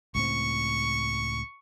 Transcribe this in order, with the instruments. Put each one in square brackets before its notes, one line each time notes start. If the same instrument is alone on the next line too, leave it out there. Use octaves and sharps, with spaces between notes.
[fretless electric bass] C#2 A2 C4 [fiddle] C#6